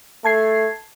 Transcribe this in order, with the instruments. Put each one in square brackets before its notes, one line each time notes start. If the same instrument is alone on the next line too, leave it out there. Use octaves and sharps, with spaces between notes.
[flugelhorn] A3 [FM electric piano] A5 G#6 C7